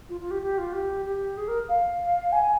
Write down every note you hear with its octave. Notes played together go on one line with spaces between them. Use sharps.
F4
F4
G4
G4
F4
G4
G4
G#4
A#4
F5
G#5